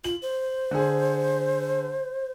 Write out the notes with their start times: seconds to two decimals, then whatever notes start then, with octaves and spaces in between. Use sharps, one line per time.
0.04 F4 F#7
0.22 C5
0.71 D3 G#4